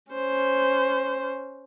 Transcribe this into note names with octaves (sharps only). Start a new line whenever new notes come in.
C#4 C5